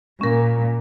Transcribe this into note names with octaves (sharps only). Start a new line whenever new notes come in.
A#2 C#4 A#4